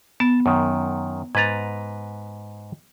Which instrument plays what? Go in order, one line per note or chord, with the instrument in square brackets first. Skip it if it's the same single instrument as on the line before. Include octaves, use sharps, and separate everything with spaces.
[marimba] B3 [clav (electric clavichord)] A5
[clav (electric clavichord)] F#2 D#3
[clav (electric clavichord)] G#2 B4 A#5 [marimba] G#6 A6